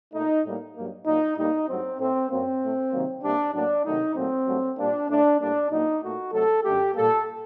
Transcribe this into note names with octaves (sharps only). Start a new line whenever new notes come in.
A#2 A3 D#4
A2 G3 A#3
G2 F#3 A#3
A#2 F#3 A#3 D#4
A2 G3 A#3 D#4
G2 F#3 A3 C4
A2 A3 C4
F#2 F#3 A#3 C4
A2 A3
C3 D#3 F#3 A#3
C3 G3 A#3 D4
A2 F#3 A#3 D4
C3 D#3 F#3 A3 D#4
A#2 F#3 A3 C4
G2 F#3 A3
A#2 G3 A#3 D4
A2 A3 D4
A2 G3 A#3 D4
A#2 F#3 A#3 D#4
A#2 A3 F#4
C3 F#3 A3 A4
F#2 D3 A3 G4
A#2 G3 A#3 A4